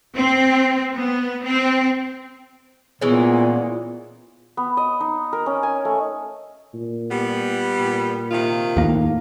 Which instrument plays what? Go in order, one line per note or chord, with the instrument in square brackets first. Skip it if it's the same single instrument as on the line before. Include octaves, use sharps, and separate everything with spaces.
[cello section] C4
B3
C4
[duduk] A#2 [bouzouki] E3 G#3 C#4 [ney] B3
[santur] B3
D#5
D#4
A#4
C#4
G#5
A3
[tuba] A#2
[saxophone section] G3 B3
[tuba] A#2
[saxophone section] C3 D#3 F4
[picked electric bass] D#2 A#3 [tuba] A2